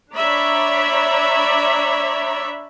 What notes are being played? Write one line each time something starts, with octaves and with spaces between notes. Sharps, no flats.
D4 C#5 D5 E5 A#5 B5